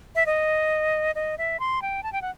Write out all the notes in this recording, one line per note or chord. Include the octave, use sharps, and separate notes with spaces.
E5
D#5
D#5
E5
C6
G5
A5
G5
F#5